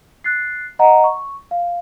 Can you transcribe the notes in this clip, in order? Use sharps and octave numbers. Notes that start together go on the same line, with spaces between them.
F#6 A6 C7
D#5 F#5 A#5
C#6
F5